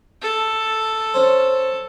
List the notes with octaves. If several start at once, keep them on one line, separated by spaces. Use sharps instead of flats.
A4
C#4 C5